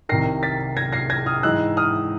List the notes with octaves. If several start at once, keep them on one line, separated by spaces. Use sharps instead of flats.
C2 C3 D#3 A#6 C7
A6 B6
G#6 A#6
A#6 C7
G#6 A#6
D#6 F6
G#2 E3 G#3 E6 F#6
D#6 F6